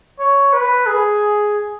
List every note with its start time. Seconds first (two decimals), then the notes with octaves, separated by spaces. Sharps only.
0.19 C#5
0.53 B4
0.87 G#4